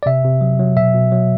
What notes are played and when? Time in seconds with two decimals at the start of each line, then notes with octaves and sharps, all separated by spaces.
0.03 D5
0.06 C3 E5
0.24 C3
0.41 F#3
0.59 F#3
0.77 B2 E5
0.95 B2
1.12 F#3